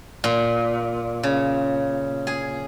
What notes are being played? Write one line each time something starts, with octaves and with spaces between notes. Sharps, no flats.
A#2
C#3
G#4